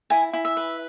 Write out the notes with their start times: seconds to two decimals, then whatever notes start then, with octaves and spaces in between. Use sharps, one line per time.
0.10 E4 G#5
0.33 E4
0.45 E5
0.57 B4